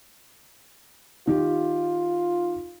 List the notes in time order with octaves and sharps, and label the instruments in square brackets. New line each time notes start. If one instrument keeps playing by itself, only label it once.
[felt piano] D#3 G4 [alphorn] F4